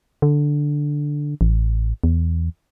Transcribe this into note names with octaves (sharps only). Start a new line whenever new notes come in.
D3
A1
E2